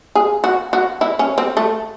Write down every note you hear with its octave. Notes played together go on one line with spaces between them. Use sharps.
G#4
F#4
F#4
E4
C#4
C4
A3